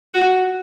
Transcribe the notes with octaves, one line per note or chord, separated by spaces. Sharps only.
F#4